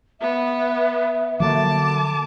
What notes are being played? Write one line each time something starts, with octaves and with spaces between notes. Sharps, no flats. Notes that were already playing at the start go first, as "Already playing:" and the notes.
B3 E5
D3 F3 F#3 A#3 A5 D6